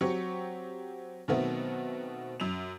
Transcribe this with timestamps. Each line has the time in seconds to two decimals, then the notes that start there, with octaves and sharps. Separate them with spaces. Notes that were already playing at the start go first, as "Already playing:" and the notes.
0.01 F#3 C4 G4 C#6 C#7
1.28 B2 D#3 F#3 A3 B3 C4
2.40 F#2 F7